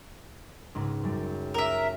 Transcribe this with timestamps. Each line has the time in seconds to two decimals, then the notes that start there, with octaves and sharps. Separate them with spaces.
0.75 C#2 G#2
1.03 F#2 G3
1.54 A#4 E5 E6 D7 D#7